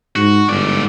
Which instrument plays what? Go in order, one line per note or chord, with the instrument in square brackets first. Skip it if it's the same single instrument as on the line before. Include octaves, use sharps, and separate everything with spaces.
[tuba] G#2 [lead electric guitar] F#4
[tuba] G1 [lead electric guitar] G#2 D5